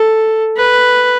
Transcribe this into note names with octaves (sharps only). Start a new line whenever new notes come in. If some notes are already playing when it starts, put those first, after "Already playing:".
Already playing: A4
B4